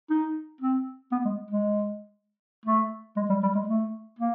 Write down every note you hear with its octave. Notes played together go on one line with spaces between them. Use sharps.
D#4
C4
B3
G#3
G#3
A3
G#3
G3
G3
G#3
A3
A#3